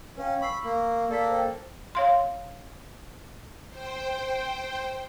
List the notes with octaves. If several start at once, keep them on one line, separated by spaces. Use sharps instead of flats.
C#4 B4 F5 G5
B5 C#6 E6 C7
A#3
A#3 A4 D5 B6
C5 G5
C#5 F5 C6
C5 G5